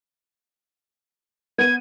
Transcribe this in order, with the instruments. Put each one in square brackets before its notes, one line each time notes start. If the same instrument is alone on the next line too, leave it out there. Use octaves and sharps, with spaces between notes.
[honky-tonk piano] B3 D#7 [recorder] G#6